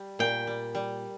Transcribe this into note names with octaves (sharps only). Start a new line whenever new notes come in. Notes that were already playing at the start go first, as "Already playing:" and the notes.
Already playing: G3
A#2 G5
G3
G3